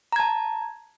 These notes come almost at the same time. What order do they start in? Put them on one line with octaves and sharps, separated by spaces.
A#5 G#6 A5